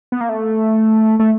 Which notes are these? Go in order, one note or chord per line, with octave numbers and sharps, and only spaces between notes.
B3
A#3
A3
A3